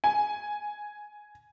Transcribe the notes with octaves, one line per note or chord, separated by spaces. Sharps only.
G#5